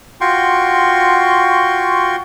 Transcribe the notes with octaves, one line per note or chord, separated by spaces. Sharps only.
F4 F#4 G5 C6 C#6